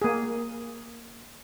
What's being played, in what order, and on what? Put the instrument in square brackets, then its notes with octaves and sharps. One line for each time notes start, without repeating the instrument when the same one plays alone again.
[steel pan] A#3 G#4